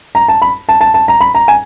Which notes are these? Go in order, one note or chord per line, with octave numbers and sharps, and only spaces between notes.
A#5
A5
B5
A5
A5
A5
A#5
B5
A#5
G#5